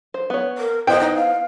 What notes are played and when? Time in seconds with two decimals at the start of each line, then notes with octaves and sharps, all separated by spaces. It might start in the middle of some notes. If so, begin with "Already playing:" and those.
0.14 C5
0.30 B3 C#5
0.57 A#4
0.87 B3 E4 C5 D#5 G5
1.00 D#4
1.15 F5